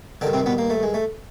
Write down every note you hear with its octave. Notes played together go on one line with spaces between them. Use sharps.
G2 D3 D#3 D4
C3 C4
B2 B3
A#3
A3
G#3
A3